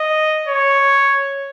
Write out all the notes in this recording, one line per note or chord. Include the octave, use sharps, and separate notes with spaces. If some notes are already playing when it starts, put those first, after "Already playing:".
Already playing: D#5
C#5